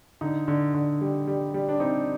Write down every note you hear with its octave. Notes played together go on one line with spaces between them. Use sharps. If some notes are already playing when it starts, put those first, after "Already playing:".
D3 D#4
D3
D3
G3
G3
G3
D4
C4 D#4